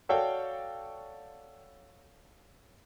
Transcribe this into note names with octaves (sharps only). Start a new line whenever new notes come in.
F#4 A4 C#5 D5 F5 G5